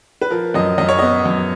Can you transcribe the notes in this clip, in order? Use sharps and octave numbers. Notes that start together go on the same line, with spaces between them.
B4
F3 A#4
F#2 D#5
F#2 D#5
C#5
B3 D#5
F#2